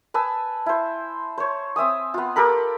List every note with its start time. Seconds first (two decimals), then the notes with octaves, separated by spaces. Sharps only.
0.14 B4 G#5 A5 E6
0.66 E4 C5
1.38 C5 C#5
1.76 C4 E5 G#5 D#6
2.14 B3 F4
2.36 G4 A4 A#4 B5